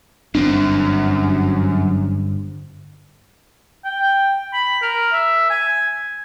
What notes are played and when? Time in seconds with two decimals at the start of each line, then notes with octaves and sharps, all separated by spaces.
0.35 G1 F#2 C4 D4
3.85 G5
4.53 B5
4.82 A#4
5.12 E5
5.50 G#5